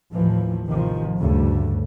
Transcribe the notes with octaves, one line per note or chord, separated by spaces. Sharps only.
D#2 A2 E3 F3
A1 C3 D#3 F3
D2 G2 C#3 A3